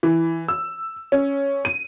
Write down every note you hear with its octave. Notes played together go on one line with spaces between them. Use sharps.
E3
E6
C#4
D#7